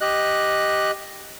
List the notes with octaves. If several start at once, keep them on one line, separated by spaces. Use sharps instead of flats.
G4 D#5 F#6